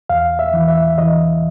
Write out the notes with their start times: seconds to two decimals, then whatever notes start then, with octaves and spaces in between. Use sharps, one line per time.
0.10 E2 F5
0.39 E5
0.54 E3
0.68 E5
0.98 E3 D#5